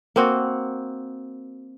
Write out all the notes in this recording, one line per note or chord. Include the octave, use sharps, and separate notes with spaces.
A#3 C4 F#4